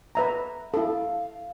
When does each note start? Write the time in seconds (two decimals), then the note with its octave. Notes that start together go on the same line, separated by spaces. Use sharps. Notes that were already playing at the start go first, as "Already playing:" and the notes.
0.15 B4 E5 A#5
0.74 E4 A4 F5